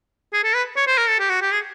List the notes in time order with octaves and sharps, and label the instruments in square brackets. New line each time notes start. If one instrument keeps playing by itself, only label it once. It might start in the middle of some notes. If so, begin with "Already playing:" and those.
[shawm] G#4
A4
B4
C#5
C5
A#4
A4
G4
F#4
G4
G#4